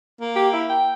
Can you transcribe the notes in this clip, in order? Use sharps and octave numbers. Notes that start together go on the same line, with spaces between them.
A#3
G4
E4
G5